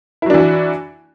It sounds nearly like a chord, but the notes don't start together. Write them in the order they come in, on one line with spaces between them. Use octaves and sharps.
E4 F#3 D4 E3 F#4